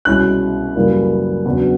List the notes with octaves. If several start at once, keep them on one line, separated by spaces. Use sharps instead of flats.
C2 B2 G#3 C#4 E4 F#6
F#2 C#3 E3 G3 A#3
E2 C#3 F#3 B3 D4